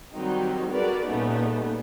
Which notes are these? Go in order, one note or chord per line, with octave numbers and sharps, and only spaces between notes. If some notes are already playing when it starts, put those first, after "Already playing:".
D#3 F#3 G3 C4 D#4
F#4 G#4 A#4 B4 D5
A#2 C#3 G3 A3 B3 D#4